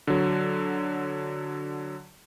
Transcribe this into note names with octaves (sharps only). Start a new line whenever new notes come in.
D3 F#3